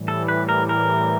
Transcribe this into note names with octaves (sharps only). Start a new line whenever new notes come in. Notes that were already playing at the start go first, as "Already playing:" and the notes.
Already playing: A2 E3 G3
A4
B4
A#4
A#4